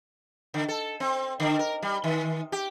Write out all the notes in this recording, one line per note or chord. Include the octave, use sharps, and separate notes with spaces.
D3
A4
C4
D3
A#4
G3
D#3
G4